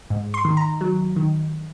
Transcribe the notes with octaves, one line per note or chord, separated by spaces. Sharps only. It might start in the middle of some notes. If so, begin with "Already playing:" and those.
G#2
C6
D#3
A#5
F#3
D#3